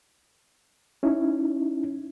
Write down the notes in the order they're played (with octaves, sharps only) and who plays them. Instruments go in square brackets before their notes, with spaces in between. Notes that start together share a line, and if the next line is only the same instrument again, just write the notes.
[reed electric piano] C#4 D#4 E4